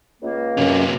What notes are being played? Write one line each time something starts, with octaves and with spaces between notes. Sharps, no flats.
C#2 A#3
F#2 C3 C#4